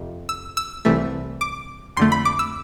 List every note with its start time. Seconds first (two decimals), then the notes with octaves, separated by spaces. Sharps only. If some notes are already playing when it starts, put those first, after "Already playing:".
Already playing: F2 C3
0.29 E6
0.57 E6
0.85 C2 C3 E3 A3
1.41 D6
1.97 F2 D3 A3 C6
2.12 B5
2.25 D6
2.39 E6